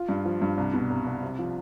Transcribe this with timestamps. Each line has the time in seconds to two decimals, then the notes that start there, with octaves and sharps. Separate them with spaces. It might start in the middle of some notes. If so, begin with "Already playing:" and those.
Already playing: F4
0.09 G2
0.25 F3
0.42 G2
0.58 C2
0.73 B2
0.90 C2
1.06 C2
1.23 C3
1.39 F3